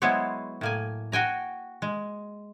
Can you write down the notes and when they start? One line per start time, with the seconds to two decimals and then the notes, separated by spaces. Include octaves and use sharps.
0.02 F#3 G#3 B3 E4 C5 C#5
0.61 A2 A#3 G#5
1.12 F#4 G5 G#5 A#5
1.82 G#3